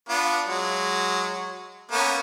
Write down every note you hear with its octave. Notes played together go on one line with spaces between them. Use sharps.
B3 D4 F4
F#3 G#3
A#3 B3 C#4